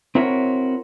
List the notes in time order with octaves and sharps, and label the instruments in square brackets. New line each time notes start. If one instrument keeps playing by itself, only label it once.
[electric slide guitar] C4 E4 F#4 A#4 C#5